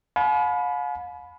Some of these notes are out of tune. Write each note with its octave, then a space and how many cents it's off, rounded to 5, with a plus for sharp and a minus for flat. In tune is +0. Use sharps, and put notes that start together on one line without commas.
F5 +45 G#5 +45 B5 +0